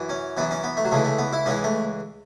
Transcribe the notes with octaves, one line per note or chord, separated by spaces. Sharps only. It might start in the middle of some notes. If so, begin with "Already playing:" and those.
Already playing: F#2 E3
C#4
F#2 E3 B3
C#4
B3
A3
F#3
C#2 C#3 E3 A3
A3
B3
E4
C#2 C#3 E3 C#4
A3